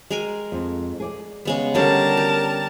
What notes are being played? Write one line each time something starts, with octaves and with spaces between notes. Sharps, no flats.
G#3 A#4 G#5
F2
G#4 D5
C#3 G#3 B3
D3 G3 C#4 A#4 A5
G4